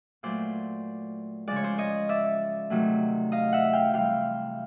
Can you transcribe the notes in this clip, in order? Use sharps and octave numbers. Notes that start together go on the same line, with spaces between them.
A#2 F#3 A3 C5 D5
C#3 F3 G#3 D5
C#5
C5 D5
C#5 D#5
D5 E5
C3 D#3 F#3 A3
D#5 F5
E5 F#5
F5 G5
C3 E3 G3 F5 G5